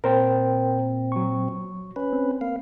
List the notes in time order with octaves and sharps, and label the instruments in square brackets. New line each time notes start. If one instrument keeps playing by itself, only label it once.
[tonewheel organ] A#2 C4 [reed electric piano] A#4 C5 G5
[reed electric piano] F#3 C#6
[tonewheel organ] C#4 B4
[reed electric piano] C4
[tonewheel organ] A#3 F5